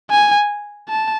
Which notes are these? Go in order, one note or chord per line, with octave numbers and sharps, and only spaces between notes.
G#5
A5